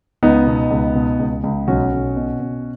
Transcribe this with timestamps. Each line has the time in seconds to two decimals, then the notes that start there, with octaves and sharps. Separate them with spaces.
0.23 C#2 B3 D#4
0.47 B2
0.70 C#2
0.95 B2
1.19 C#2
1.44 C#2
1.67 B1 C#4 F#4
1.92 B1
2.16 B2
2.40 B2